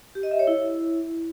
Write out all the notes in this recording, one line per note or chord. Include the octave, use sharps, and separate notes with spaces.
G4
D#5
E5
C#5
E4